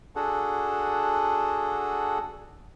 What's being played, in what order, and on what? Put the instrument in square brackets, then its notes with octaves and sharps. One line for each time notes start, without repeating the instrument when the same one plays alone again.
[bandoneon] D4 F#4 G#4 A4 F#5